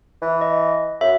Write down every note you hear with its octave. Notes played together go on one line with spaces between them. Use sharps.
E3
D#5
F#2 E5